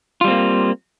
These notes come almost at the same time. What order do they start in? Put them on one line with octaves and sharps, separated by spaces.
F4 G3 C4 A#3